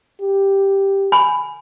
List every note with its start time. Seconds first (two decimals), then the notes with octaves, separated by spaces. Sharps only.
0.21 G4
1.12 G#5 B5